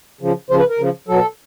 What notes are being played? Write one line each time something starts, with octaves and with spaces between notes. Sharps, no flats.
C#3 F3
C#3 F3 C5
B4
A#4
C#3 F3
B2 F#3 A4